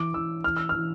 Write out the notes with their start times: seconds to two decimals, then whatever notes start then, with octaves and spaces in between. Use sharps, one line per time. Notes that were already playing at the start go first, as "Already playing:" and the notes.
Already playing: E3 D6
0.14 E3 E6
0.44 E3 F6
0.57 E6
0.69 E3 F6